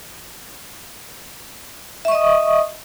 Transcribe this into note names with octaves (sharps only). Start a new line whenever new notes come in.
D#5 E5 C#6 D#6